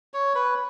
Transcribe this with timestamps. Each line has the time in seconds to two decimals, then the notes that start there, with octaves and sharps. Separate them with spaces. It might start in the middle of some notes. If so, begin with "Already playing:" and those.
0.14 C#5
0.35 B4